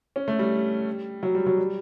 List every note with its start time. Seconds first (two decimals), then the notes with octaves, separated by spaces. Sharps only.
0.16 C#4
0.28 A3
0.39 G3
1.23 F#3
1.35 G3
1.46 F#3
1.58 G3